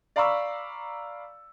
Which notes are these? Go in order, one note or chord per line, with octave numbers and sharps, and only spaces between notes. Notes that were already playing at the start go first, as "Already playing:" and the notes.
D5 F5 A#5 B5 C#6 E6